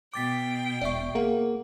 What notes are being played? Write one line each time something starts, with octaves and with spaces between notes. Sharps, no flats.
B2 G5 D6 A6 B6
E1 D5 E5 C#6
A#3 G#4 A#4 F#5